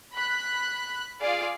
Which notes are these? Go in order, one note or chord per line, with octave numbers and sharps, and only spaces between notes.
B5 F#6
F4 G#4 D5 F5